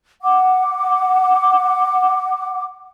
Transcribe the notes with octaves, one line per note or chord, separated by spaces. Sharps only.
F#5 D6